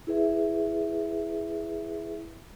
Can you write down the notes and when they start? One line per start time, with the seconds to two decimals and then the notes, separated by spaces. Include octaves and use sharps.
0.07 E4 G#4 B4 E5